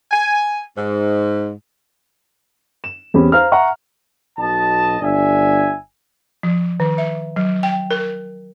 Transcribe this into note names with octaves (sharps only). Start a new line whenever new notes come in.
G#5
G#2
E7
E2 C4 C#4 G4 B5
C5 F5 A#5 F6
E5 F#5 A#5 C#6
B1 B2 D#5 A5
G1 D4 E5 G#5
F3
D#3
E5
F#3
G5
A#4